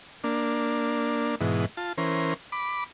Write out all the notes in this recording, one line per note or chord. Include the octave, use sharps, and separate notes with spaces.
A#3 D4
G#2 B2 E3
F4 A5
E3 C#4 A#4 C5
B5 D6